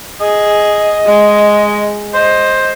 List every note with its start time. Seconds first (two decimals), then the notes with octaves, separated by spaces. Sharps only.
0.21 G#4 D#5
1.06 G#3
2.14 C5 D#5